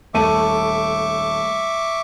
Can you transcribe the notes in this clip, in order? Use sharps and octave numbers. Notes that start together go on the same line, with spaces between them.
D#1 A3 E5 C#6 D6 D#7